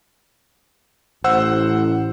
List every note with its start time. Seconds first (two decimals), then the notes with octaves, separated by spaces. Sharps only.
1.24 A1 C5 F#5 E6